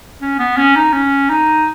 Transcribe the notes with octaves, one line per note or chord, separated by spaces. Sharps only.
C#4
B3
C#4
D#4
C#4
D#4